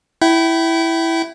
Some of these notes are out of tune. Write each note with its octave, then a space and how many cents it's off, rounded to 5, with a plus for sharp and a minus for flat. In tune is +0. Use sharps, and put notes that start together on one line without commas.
E4 +0 G5 -35